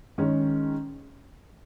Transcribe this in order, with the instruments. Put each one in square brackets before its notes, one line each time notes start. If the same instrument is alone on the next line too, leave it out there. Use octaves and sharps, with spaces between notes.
[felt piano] D#3 G#3 C#4